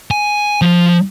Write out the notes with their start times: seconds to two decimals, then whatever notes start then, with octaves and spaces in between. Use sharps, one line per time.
0.11 G#5
0.62 F3